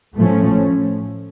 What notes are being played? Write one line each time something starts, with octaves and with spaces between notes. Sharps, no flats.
A2 F3 A3 C#4